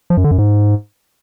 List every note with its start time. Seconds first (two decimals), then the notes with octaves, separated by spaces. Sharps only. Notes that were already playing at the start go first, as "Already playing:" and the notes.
0.10 F3
0.17 F#2
0.24 D3
0.31 F#2
0.38 G#2